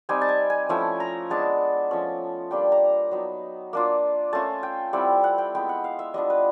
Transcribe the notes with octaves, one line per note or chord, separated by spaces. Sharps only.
G3 C4 D#4 G#5
A5
G#5
G#5
F3 A3 C#4 E4 G#5
A#5
G#3 B3 D4 A5
F3 A3 C#4
G3 A#3 D4 F4 G5
A#5
F#3 B3 D#4
A#3 D4 F4
A3 C#4 F4 A5
G5
G3 C4 E4 F#5
F#5
G5
G#3 B3 E4 G5
F#5
F5
E5
G3 B3 D4 F4 D#5
B4